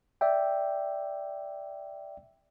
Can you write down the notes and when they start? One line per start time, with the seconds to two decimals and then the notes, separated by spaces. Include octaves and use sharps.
0.21 D5 E5 G5